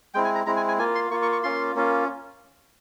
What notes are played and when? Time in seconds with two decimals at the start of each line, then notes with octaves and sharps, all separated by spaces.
0.14 G#3 C4 E4 G5
0.25 G#5
0.35 A#5
0.46 G#3 C4 E4 A#5
0.57 G#5
0.68 G#5
0.79 A#3 F4 G#5
0.95 C6
1.11 A#3 F4 C#6
1.22 C#6
1.32 C#6
1.43 A#3 C#4 F4 C6
1.75 A#3 C#4 F4